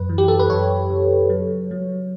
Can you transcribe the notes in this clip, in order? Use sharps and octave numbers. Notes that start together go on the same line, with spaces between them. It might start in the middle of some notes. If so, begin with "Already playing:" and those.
Already playing: F#2 B4
E3
G4
A4
B4
F#2 C#5
C#3
F#3
F#3